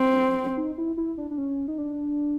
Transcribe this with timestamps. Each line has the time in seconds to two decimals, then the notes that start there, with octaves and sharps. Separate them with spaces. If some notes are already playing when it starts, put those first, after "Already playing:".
Already playing: C4
0.57 D#4
0.78 E4
0.97 E4
1.18 D4
1.31 D4
1.38 C#4
1.68 D#4
1.78 D4